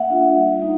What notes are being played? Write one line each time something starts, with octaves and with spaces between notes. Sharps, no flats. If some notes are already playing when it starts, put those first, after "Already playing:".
Already playing: A#3 E5 F#5
D4 F4
G3
A#3 D#4